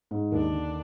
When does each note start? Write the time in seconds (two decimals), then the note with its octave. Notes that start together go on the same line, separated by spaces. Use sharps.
0.11 G#2
0.32 D#2 D4
0.53 D3